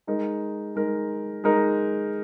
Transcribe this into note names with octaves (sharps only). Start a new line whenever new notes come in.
G#3 D#4 A#4
G#3 D#4 A#4
G#3 D#4 A#4